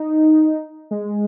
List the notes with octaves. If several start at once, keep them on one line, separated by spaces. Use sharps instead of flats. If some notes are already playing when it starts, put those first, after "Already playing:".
Already playing: D#4
G#3